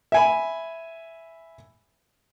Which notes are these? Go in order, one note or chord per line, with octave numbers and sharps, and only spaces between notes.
E5 G#5 B5